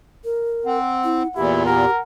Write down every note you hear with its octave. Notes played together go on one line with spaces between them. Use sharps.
A#4
C4 F#5
E4
E2 A#2 E4 G4
G4 A#4 F#5